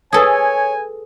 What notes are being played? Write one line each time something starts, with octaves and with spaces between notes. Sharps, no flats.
G#4 A4 B4 C#5 G#5 D#6 G#6